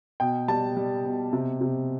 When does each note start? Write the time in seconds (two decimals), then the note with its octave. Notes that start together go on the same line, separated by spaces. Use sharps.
0.20 B2 G5
0.48 G3 A5
0.77 G3
1.05 B2
1.33 C3
1.61 C3